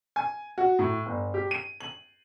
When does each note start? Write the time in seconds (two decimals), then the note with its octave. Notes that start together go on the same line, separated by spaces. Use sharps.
0.16 G#5
0.58 F#4
0.79 A2
1.06 G1
1.34 G4
1.51 D#7
1.81 F#7